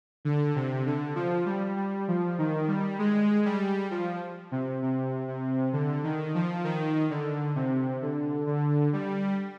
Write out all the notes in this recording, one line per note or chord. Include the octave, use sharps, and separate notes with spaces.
D3
C3
D3
F3
G3
G3
F3
D#3
G3
G#3
G3
F3
C3
C3
C3
D3
D#3
F3
D#3
D3
C3
D3
D3
G3